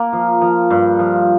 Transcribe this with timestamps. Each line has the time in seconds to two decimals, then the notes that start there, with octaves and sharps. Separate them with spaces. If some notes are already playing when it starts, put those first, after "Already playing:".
Already playing: A#3
0.13 F3
0.42 F3
0.70 G2
0.99 F3